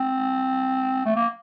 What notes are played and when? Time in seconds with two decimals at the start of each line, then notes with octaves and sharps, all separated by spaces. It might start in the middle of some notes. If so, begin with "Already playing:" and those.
Already playing: C4
1.05 A3
1.16 A#3